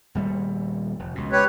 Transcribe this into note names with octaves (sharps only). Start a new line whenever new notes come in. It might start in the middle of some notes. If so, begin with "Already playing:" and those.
D#1 G3 A3
F1
C#2 B2
G4 B4 C#5